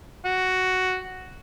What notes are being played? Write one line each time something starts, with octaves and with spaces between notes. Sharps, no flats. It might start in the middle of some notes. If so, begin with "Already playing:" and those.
F#4